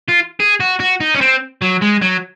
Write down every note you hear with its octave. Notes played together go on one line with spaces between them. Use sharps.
F4
G#4
F#4
F#4
D#4
C#4
C4
F#3
G#3
F#3